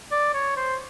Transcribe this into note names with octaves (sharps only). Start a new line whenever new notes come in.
D5
C#5
C5